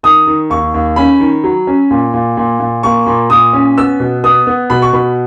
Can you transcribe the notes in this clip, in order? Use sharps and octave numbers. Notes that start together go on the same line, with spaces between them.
D#3 D#6
D#3
D#2 C#6
D#2
C#4 B5
D#3
F#3
C#4
A#2
A#2
A#2
A#2
A#3 C#6
A#2
A#2 D#6
C#4
B3 E6
B2
B3 D#6
B3
B2 B5
C#6
B2 B5